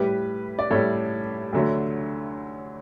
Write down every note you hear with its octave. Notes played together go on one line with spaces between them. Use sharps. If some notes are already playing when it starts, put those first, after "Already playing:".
Already playing: A2 G3 G4 B4
D5
A2 G3 A4 C#5
D2 D3 F#3 A3